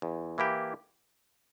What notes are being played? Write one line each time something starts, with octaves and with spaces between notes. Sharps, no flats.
E2
E3 A#3 E4 G4